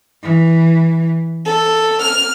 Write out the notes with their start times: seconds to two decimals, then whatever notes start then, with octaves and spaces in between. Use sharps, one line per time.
0.23 E3
1.46 A4
2.02 F6